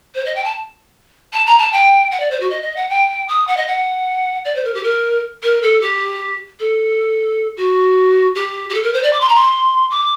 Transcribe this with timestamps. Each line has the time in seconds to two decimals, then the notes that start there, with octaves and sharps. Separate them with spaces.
0.15 C5
0.26 D#5
0.35 G5
0.44 A5
1.33 A5
1.46 A#5
1.58 A5
1.72 G5
2.11 F#5
2.20 D5
2.31 C5
2.40 F#4
2.50 D#5
2.62 D#5
2.76 F#5
2.89 G5
3.28 D#6
3.47 F#5
3.57 D#5
3.67 F#5
4.45 D5
4.55 C5
4.65 A#4
4.74 G4
4.83 A#4
5.43 A#4
5.62 A4
5.81 G4
6.60 A4
7.57 F#4
8.35 G4
8.70 G4
8.74 A4
8.83 A#4
8.93 C5
9.03 D5
9.13 D6
9.20 C6
9.29 A#5
9.35 C6
9.91 D6